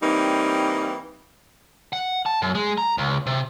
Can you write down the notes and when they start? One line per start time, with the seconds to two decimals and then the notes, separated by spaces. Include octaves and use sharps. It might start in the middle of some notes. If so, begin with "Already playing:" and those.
0.02 E3 G3 A#3 C4 D#4
1.93 F#5
2.26 A5
2.42 F#2
2.55 G#3
2.78 A#5
2.98 C#2
3.27 C3